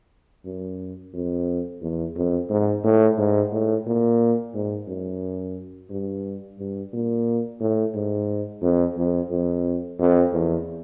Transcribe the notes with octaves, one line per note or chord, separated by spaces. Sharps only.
F#2
F2
E2
F2
G#2
A2
G#2
A2
A#2
G#2
F#2
G2
G2
A#2
A2
G#2
F2
F2
F2
F2
E2